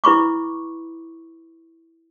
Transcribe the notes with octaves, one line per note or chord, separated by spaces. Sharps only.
E4 B4 B5 C#6 D6